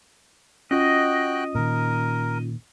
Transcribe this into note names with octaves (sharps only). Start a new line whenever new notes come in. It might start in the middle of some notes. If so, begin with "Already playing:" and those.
C#4 F4 F#4 D#5 G5 F#6
A#2 D#3 A#4